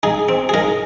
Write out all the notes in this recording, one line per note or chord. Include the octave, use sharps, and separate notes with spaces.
D#4 G#4
C4
G#4
D#4 A#4